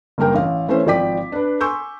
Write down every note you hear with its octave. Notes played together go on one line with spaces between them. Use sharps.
F#1 G2 A#3 A#4 G5
A1 F5
E3 A3 C#4 C5
G#1 F3 D5 G5 D6 B6
D4 B4
G#5 C6 C#6 E6 G6